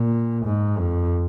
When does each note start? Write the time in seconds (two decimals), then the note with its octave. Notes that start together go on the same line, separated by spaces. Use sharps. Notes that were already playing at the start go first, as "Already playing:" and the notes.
Already playing: A#2
0.45 G#2
0.78 F2